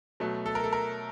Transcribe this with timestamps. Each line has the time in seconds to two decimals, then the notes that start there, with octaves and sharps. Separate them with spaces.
0.20 B2 F#3 A3
0.46 A4
0.55 A#4
0.64 A4
0.73 A#4